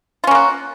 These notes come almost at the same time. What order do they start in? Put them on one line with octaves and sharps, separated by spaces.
F4 C#4 A#3 F#4